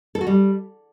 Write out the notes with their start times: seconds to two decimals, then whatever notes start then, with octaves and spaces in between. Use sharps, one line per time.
0.15 A4
0.21 F#4
0.27 G3